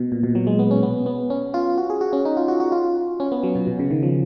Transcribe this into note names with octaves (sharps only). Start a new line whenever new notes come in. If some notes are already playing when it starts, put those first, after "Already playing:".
Already playing: B2
A#2
B2
F#3
G#3
B3
C#4
B3
B3
C#4
F4
F#4
G#4
F#4
C#4
D#4
F4
F#4
F#4
F4
C#4
B3
F#3
B2
B2
C#3
D#3
F3